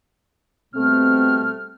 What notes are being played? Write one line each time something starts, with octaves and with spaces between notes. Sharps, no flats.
B2 G3 A3 C4 F6